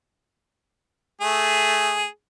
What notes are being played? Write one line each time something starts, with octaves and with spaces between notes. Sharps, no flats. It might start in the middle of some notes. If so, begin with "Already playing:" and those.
A3 G#4